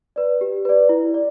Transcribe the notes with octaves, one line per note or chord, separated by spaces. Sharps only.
B4 D5
G4
B4 D5
E4
D5